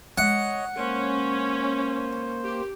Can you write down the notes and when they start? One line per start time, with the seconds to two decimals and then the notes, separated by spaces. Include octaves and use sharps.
0.18 G#3 C#5 D#5 F#5
0.77 A#3 C#4 C5
2.44 G4